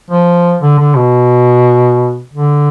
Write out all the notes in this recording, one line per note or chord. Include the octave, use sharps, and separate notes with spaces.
F3
D3
D3
B2
D3